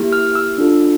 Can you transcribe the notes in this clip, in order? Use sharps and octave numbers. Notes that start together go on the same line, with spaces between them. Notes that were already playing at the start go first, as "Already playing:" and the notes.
Already playing: A#3 E4 G4
F6
E6
D4 F4 A4